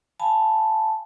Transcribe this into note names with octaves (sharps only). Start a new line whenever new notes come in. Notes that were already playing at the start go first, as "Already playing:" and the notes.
F5 G#5 A5 B5